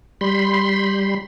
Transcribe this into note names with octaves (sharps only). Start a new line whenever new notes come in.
G3 B5 C6